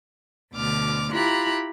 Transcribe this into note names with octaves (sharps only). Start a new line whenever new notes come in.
D2 B2 D3 D6 F6
E4 F4 G4 A#5 B5 F#6